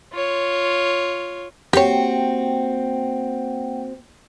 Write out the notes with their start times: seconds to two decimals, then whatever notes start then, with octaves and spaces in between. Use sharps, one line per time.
0.13 F4 C#5
1.73 A#3 C4 F#4 G4 C#5 F#5 G5